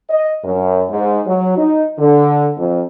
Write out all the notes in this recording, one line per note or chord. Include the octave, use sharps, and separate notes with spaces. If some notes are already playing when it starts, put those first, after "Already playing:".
D#5
F#2
G#2
F#3
D#4
D3
F2